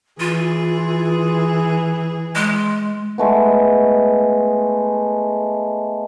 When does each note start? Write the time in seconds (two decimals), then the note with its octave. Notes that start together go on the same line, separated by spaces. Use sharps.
0.20 E3 F4 G#4
2.35 G#3
3.18 G#3 A3 B3